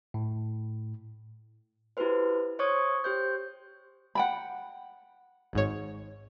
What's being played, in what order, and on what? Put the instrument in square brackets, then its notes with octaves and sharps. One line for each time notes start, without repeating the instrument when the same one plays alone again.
[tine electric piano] A2
[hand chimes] E4 F#4 G4 A4 B4 C5
C5 C#5 C#6 D#6 G#6
G4 C5 G6
[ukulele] F#5 G5 B5
[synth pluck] G#1 G#2 C#5